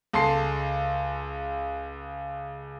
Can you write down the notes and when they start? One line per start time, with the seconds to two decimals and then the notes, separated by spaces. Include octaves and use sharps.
0.13 C#2 A4 C6 C7